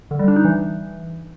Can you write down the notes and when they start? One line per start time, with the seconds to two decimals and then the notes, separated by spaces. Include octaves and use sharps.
0.11 D3
0.19 G3
0.28 D4
0.36 D#4
0.45 E3